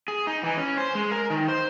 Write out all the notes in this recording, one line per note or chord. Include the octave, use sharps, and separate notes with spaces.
G#4
D#4
E3
C#4
C5
G#3
A#4
D#3
C5